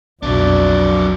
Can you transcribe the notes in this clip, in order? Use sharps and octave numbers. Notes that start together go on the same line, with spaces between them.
B1 F2 B2 F#3 D4 D5